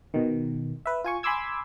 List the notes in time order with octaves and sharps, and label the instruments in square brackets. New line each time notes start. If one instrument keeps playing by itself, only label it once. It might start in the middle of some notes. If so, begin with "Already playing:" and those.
[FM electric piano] B2 D#3
B4 E5
F4 G#5 C#6
G#5 B5 C6 D6 E6 G#6